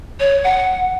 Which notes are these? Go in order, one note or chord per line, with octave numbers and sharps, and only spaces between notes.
C#5
F#5